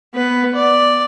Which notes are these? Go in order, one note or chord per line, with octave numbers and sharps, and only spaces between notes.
B3 B4
D5